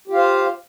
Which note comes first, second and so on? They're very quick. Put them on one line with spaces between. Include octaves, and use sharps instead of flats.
G4 F4 F5 C5